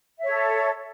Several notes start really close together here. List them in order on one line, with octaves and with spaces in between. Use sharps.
E5 C#5 A4